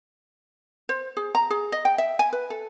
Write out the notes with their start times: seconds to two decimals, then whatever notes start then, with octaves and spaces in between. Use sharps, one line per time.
0.89 C5
1.17 G#4
1.35 A#5
1.50 G#4
1.72 D#5
1.85 G5
1.98 E5
2.19 G#5
2.33 B4
2.50 A4